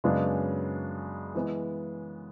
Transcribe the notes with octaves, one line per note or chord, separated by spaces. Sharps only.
F#2 C#3 G#3 B3 D4
E3 G#3 B3